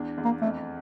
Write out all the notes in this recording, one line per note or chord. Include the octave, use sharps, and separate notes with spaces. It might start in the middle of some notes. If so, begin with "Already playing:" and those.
Already playing: E2 D4
E2
A#3
F2 A3